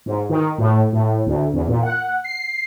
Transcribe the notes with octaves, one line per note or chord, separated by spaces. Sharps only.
G#2
D#3
A2
A2
D2
E2
A#2
F#5
C7